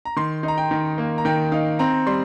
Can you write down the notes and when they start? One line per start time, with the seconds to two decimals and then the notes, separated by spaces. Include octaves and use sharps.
0.05 A#5
0.16 D#3 C6
0.43 D#4
0.48 A#5
0.58 G5
0.71 D#3
0.98 A#3
1.18 A#5
1.25 D#3 G5
1.52 D#4 F5
1.79 C4 A#5
2.07 G3 C6